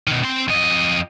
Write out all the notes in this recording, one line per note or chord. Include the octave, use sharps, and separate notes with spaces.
B2 D#3
C4 C6
F2 D#5